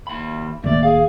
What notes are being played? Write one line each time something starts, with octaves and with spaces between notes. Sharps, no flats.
D#2 B5
D1 D#3 A3 A#3 D5
G#4 F5